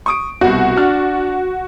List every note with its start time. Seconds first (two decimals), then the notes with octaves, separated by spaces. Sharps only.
0.06 C#6 D#6 D7
0.41 C2 B2 F#4
0.76 D4 F6